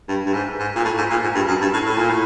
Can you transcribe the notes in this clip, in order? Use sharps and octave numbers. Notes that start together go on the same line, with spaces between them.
G2
G2
G#2
G#2
A#2
A2
G#2
A#2
G#2
G2
F#2
G2
A2
A2
A#2
A2